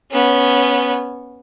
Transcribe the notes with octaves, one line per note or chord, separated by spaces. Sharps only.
B3 C#4